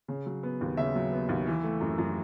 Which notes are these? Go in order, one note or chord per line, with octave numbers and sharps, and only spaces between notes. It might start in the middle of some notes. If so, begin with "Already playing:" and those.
C#3
F#3
B3
D#2
C#3 E5
F#3
B3
D#2
E3
A3
F#2
F#2